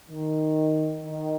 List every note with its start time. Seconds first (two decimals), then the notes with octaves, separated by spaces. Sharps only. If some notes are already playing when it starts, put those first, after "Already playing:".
0.10 D#3
1.04 D#3